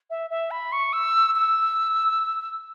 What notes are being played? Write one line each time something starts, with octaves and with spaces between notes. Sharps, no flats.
E5
E5
B5
C#6
E6
E6